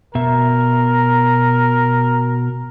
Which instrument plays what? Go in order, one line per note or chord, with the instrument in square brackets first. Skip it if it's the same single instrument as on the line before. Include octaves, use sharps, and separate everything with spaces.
[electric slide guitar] B2 E5 [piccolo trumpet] A#4